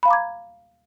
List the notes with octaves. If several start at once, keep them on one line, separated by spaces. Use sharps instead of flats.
F5 A#5 B5 D6 G#6